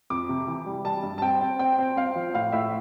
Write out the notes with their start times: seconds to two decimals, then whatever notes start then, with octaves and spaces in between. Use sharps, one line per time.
0.10 F2 D6
0.29 C3
0.48 E3
0.66 G3
0.85 G3 A5
1.03 G2
1.18 A5
1.22 C4 G5
1.41 C4
1.59 C4 G5
1.79 C4
1.97 C4 F5
2.16 F3
2.34 A2 F5
2.52 A2 E5